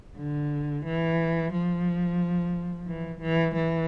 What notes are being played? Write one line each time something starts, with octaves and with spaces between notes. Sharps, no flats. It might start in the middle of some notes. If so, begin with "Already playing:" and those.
D3
E3
F3
E3
E3
E3